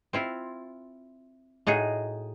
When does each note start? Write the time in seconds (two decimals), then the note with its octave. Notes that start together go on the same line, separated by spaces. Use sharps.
0.13 C4 E4 F4
1.67 A2 D#4 F#4 G#4